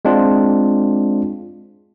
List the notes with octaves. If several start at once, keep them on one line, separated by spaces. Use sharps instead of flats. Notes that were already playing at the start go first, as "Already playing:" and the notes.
G#3 C4 D4 F4